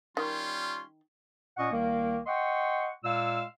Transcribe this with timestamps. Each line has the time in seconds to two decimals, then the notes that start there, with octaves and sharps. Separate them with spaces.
0.17 D#3 G3 C#4 F4 C6
1.57 A#2 C#4 D#5 F#5 C#6
1.70 C2 D#3 A#3
2.26 D#5 F#5 G5 C6 C#6
3.03 A#2 G#3 F5 E6